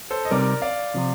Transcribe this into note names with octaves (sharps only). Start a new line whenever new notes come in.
A4 C5
D#5
C3 G3 C4 D#4 A#4 D5
D5 F5
C3 F3